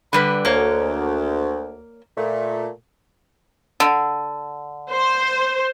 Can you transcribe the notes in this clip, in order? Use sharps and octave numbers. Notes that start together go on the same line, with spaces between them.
D3 G3 B4 B5
D2 A#3 C#5
A#2 A3
D3
C5